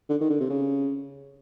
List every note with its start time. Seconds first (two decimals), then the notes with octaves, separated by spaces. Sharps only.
0.09 D3
0.21 D#3
0.30 D3
0.40 C3
0.50 C#3